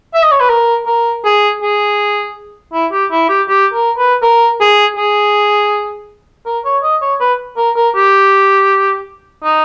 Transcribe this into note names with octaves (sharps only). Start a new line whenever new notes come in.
E5
D#5
C#5
B4
A#4
A#4
G#4
G#4
E4
G4
E4
G4
G4
A#4
B4
A#4
G#4
G#4
A#4
C#5
D#5
C#5
B4
A#4
A#4
G4
D#4